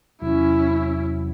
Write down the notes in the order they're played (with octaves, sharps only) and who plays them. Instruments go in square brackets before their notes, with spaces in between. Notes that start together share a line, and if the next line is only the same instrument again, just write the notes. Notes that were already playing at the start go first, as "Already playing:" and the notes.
[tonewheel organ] E2 C3 F#3 [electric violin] C#4 E4